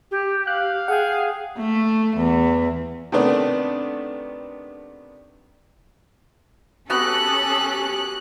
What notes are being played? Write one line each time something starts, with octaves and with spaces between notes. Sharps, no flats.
G4
F5 F#6
G#4 F#5 G5
A3
E2
C3 D#3 A3 B3 D4
B3 C#4 F#4 G4 A4 B5 F#6